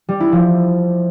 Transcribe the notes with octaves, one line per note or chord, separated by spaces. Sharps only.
G3
E4
F3